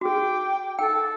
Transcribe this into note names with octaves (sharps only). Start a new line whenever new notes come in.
F#4 G#4 G5 D6
A4 G5 E6